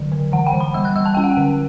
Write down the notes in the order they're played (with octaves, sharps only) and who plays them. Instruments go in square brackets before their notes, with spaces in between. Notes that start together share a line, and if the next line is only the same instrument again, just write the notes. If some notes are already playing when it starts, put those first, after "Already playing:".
Already playing: [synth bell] D3 F#3
D3
E3 F#5
G5
E3
B5
G3 E6
F#6
G3 E6
A5
C#4 G5
F#5
G5
D3